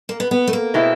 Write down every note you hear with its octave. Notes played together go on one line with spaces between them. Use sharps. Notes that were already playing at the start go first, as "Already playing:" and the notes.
A#3
B3
B3
A3
A#3
B2 G#3 C4 E4